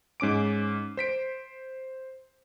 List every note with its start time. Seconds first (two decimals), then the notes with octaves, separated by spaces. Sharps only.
0.20 G#2 C#4 D6 D7
0.97 C5 B6 D7